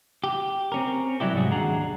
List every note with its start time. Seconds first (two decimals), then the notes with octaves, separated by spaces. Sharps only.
0.24 G4
0.72 C4 C#4 A#4
1.20 F#3 G3 E4 G4
1.34 C2 G#2 F#3 G3 F#4 G#4
1.52 D#2 D4 G#4 F#5 A#5